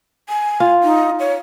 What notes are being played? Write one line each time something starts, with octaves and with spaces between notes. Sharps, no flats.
G#5
F4
D#4
C#5